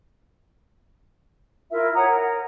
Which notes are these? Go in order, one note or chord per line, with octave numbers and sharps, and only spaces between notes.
E4 F4 A#4 E5
C#5 F#5 A#5 D#6
A#4